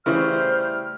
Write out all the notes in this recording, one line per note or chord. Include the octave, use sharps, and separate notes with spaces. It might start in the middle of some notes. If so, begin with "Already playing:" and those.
C#3 E3 G3 A3 E4 C5 F6